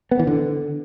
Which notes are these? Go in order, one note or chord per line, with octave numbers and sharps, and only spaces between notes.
B3
E3
D3